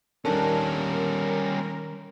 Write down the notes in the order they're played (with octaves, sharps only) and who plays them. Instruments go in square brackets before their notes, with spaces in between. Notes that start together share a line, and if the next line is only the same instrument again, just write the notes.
[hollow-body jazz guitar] D#3 D4 A4 [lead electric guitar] G3 C#4 [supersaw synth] A#4